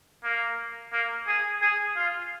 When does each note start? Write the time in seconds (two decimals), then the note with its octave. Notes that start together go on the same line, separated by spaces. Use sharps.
0.24 A#3
0.93 A#3
1.27 G#4
1.62 G#4
1.96 F4